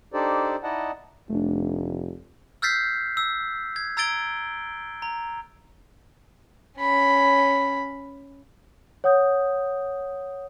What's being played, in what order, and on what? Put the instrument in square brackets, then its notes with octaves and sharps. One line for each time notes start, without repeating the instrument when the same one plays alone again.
[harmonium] D4 D#4 G4 A4 C5 D5
D#4 E4 D5 D#5 F#5 A5
[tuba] F1 [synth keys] A3 D4
[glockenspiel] E6 F6 G6 A6 B6 C7
E6
G#6
A#5 E6 G#6 A6 D7 G7
A#5
[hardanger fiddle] C#4 B5
[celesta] C#5 F#5 D#6 G6